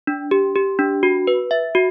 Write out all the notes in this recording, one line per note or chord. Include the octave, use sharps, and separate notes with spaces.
D4
G4
G4
D4
F#4
B4
E5
F#4